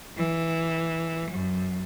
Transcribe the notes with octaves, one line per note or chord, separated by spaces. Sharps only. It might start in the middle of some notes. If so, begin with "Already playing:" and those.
E3
F#2